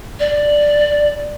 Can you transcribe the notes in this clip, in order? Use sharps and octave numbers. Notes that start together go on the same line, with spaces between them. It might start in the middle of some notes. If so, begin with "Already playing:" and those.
D5